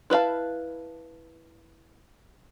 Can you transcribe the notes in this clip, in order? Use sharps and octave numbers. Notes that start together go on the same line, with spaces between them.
E4 B4 C#5 F5 A5